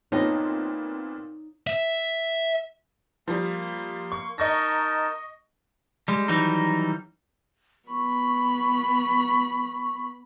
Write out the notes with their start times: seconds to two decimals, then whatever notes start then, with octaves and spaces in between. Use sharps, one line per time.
0.12 A#2 B3 C4 D#4 C#5 A5
1.67 E5
3.28 F3 G3 A#3 C6
4.12 C#6
4.38 D#4 A#4 D#5 A5 C#6 A#6
6.08 G3 G#3
6.28 D#3 E3 F#3 G3 D#4
7.89 B3 B5 C#6